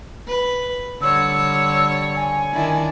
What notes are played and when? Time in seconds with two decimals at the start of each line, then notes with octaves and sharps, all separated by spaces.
0.28 B4
1.02 D3 G3 C#5 E6
2.16 G#5
2.53 D#3 D4 E4